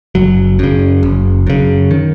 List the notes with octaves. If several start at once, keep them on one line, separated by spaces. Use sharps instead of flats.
F#1 F#3
F#2 C#3
F#1
F#2 C#3
D#3